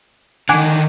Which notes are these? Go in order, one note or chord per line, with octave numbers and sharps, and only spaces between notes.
D3 D#3 F#5 G#5 D6